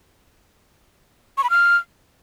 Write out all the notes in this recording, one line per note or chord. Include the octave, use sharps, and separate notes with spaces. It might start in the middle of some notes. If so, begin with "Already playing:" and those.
C#6
B5
F6